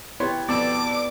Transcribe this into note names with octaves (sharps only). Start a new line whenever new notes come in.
B3 E4 G4 C#5 C6
F2 B2 B3 D5 A5 D6 E6